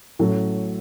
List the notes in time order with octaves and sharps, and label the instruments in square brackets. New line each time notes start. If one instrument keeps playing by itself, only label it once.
[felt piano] A1 A2 F#3 A4